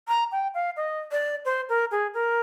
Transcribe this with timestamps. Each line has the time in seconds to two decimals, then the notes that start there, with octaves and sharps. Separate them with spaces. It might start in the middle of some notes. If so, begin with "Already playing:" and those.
0.08 A#5
0.32 G5
0.54 F5
0.77 D#5
1.12 D5
1.45 C5
1.69 A#4
1.91 G#4
2.14 A#4